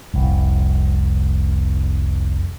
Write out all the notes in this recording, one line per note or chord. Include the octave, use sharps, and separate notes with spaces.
F1 C2